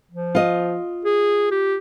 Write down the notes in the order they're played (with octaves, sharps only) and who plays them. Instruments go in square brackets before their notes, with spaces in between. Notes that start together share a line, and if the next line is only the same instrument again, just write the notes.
[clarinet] F3
[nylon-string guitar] F4 D#5
[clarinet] G#4
G4